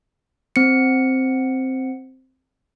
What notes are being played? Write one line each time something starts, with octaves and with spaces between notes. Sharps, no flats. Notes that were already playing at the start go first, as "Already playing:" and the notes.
C4 C#7